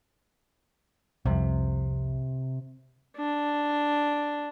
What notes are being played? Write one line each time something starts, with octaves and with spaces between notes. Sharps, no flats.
C2 F2 C3
D4